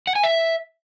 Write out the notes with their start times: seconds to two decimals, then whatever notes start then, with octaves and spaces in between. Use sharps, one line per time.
0.07 F#5
0.15 G#5
0.23 E5